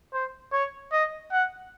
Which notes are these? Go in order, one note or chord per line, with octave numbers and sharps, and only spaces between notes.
C5
C#5
D#5
F#5